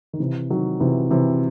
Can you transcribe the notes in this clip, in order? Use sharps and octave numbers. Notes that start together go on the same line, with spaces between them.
D#3
C3 E3
D#3 F#3
C3 E3
C3 E3